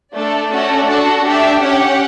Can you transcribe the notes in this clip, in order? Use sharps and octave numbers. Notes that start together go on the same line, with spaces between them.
A3 D4 A4 D5
A3 C#4 F#4 A4
D4 F#4 A4
D4 G4 E5
C#4 G4 F#5